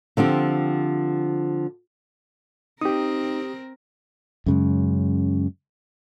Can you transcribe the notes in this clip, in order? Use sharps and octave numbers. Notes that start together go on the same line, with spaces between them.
D3 F3 C4 G4
C4 D#4 G4 A#4 D#6
F#2 C#3 G#3